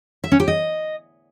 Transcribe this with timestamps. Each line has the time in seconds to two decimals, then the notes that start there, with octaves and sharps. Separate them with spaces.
0.24 E5
0.32 C#4
0.40 G4
0.48 D#5